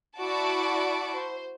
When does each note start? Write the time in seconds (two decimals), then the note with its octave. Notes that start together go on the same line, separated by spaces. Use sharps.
0.18 E4 F#4 D5 A5 D7
1.14 C5